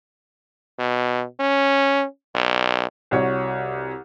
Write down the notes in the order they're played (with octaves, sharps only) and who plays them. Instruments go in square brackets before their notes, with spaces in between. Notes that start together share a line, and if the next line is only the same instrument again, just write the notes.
[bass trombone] B2
C#4
B1
[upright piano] C2 F#4 C#5